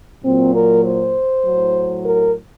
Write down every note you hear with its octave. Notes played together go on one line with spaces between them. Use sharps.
A#2 F#3 C4
A#4
C5
A2 F#3
A#4